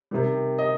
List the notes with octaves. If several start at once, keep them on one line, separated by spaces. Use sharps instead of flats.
C3 D#3 G3
D#5